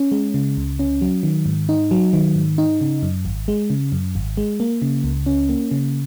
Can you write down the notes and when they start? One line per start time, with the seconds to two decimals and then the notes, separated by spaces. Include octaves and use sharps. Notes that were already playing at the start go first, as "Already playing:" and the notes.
Already playing: C#4
0.12 G#3
0.34 C#3
0.57 C#2
0.79 C#4
1.01 F#3
1.23 D#3
1.46 G#2
1.69 D#4
1.91 F#3
2.13 D#3
2.35 G#2
2.58 D#4
2.81 C#3
3.03 F#2
3.25 G#1
3.48 G#3
3.70 C#3
3.92 F#2
4.15 G#1
4.37 G#3
4.60 A#3
4.82 C#3
5.04 C#2
5.26 C#4
5.49 A#3
5.71 C#3